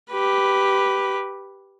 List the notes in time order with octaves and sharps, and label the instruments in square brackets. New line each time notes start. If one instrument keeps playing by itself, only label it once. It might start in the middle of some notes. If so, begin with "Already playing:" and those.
[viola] G4 B4